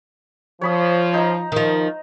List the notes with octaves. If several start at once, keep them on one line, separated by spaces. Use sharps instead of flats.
F3 C#5 B5 D#6
D#4 C5 A#5
D#3 F3